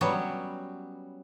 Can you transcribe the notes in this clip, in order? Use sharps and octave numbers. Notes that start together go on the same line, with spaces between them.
F#3 G3 B3 C#4